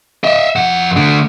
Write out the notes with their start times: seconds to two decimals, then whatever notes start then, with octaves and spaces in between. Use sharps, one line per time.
0.24 D#5 E5
0.56 F2 F#5
0.96 D3 A3